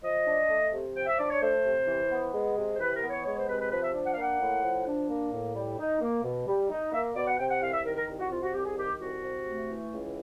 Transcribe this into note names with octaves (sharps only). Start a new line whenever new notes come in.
F3 D#5
D4
A3
C3
F3 G5
E5
D4 D5
C#5
A3 C5
C3
E3
B3
G#3
C3
C5
E3 B4
A#4
B3
C#5
G#3 C#5
C5
C3 B4
B4
F3 B4
E5
D4
F#5
F5
A#3 F#5
A2
F3
D4
A#3
A2
G3
D#4
A#3
B2
G3
D#4
A#3 E5
B2 D5
F#5
C3 G5
F#5
C2 F5
E5
D#3 A#4
A#4
C2
F#4
C3 F4
F#4
C2 G4
G#4
D#3 G4
C2 F#4
C3
A3
E3
C#2